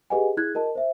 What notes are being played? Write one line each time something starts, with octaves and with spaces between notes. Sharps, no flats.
G4 G#4 B4 D#5 F#5 G#5
E4 G#4 F#6 G#6
F#4 A#4 D#5 A5
C5 E5